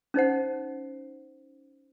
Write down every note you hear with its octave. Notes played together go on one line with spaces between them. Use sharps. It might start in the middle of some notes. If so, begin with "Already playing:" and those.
C#4 D#4 C5 F#5